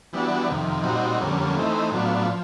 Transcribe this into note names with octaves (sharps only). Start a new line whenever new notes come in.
E3 G3 B3 D4 F#4
F2 C3 D#3
A#2 G3 C4 D#4 F#4
F2 D3 G3 A#3 C#4
E3 A3 C4 D#4
A2 F#3 B3 D4 F4
F3